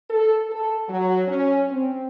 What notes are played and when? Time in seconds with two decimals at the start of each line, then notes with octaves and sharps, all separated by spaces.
0.10 A4
0.50 A4
0.88 F#3
1.27 C#4
1.70 C4